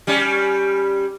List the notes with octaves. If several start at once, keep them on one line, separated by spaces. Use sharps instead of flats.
G3 C#4